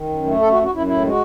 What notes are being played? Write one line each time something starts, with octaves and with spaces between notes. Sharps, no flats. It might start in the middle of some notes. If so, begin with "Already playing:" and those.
Already playing: D#3
F#2
A3
F#2 A4
F#4
F#2
F#4
F#2 E4
A2 E4
G#3
F#4